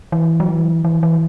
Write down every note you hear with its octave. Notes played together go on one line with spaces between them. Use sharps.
E3
F#3
E3
E3
E3